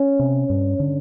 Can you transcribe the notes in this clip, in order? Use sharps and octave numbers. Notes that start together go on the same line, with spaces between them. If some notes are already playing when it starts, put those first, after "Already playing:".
Already playing: C#4
C3
G2
D3